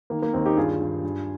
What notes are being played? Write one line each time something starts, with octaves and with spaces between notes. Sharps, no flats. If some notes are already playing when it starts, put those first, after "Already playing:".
D#3 A#3
A#3
D#2 C4 D#4
D#4 G4
G2 F4 G#4
G2
G2